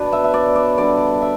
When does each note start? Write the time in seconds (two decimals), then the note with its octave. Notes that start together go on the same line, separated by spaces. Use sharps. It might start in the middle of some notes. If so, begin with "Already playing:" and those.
Already playing: B2 B3 D4 B4 D5
0.12 E5
0.24 E5
0.34 D5
0.56 D5
0.78 D3 G3 D4 D5
1.22 E5